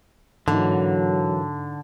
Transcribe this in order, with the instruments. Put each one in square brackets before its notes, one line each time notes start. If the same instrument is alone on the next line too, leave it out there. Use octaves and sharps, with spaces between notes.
[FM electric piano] G#2 D#4 [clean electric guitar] D3 [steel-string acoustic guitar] E3 A#3 [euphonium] F#3